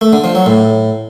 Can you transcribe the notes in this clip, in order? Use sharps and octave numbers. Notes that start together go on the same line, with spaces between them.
A3
D3
F3
F#3
A2